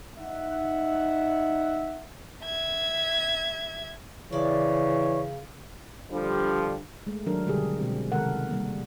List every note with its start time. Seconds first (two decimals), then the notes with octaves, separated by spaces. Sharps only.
0.19 D#4 E5 F#5
2.45 E5 G#6
4.33 C#3 E3 F3 C#5 D5
6.11 D3 F3 G3
7.07 G#3 A3
7.26 D#3 F#3 D4 A4 A#4
7.46 B2 D3 G3 G#3 G4 G#4
7.79 B2 G#3 C4 G4
8.12 C3 D#3 G#3 A4 A#4 F#5
8.49 G3 A#3